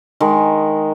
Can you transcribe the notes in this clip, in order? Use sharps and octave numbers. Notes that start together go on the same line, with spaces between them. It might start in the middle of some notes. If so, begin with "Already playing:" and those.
D#3 G#3